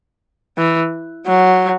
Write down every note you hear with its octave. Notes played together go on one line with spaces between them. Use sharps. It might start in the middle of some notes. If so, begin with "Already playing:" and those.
E3
F#3